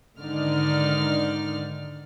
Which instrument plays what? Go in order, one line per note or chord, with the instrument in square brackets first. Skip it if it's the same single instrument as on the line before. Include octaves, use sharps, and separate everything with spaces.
[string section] G#2 D3 D#3 D#4 D5 F6